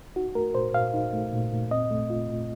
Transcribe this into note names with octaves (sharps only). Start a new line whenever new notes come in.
D#4 F#4
A3 A#4
A#2 C5
A#2 F5
D#4
A3
A#2
A#2
C4 D#5
A3
F4
A#2